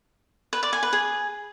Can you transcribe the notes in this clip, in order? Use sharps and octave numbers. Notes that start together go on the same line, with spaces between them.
B4
D5
G#5
B4
G#4